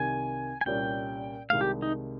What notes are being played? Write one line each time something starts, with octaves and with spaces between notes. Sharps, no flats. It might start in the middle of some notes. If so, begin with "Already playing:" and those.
Already playing: C2 C3 D#3 G#5
G#5
C2 A#2 G3 C#4 G5
C2 C3 D#3 G#3 F5
G4
D#4